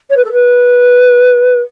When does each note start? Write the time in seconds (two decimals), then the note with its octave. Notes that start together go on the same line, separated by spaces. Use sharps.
0.10 C#5
0.16 B4
0.24 A4
0.32 B4